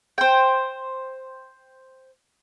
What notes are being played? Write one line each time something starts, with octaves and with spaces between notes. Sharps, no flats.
C5 G5